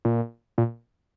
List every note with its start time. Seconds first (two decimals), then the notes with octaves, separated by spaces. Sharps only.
0.05 A#2
0.58 A#2